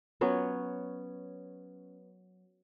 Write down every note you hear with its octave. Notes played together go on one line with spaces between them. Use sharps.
F#3 B3 C#4